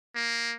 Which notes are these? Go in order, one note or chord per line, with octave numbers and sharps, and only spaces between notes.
A#3